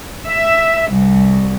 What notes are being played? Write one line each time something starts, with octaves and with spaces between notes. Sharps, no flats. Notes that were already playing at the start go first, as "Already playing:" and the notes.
E5
C2